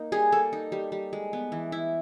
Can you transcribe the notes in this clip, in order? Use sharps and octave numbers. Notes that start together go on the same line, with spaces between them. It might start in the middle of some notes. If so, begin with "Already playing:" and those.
Already playing: A#3 D#4
G3 G#4
A#3 A4
D#4
G3
G3
G#3
B3
E3
E4